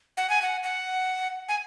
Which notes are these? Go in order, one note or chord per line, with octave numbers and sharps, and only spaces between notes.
F#5
G#5
F#5
F#5
G#5